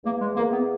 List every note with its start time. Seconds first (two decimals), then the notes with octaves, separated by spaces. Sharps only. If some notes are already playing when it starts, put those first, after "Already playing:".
0.04 E2 A#3
0.21 G#3
0.36 E2 A#3
0.53 B3